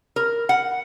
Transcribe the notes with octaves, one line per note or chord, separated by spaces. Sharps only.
A#4
F#5